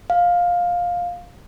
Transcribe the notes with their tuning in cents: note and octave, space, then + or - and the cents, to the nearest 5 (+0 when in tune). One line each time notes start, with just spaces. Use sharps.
F5 +15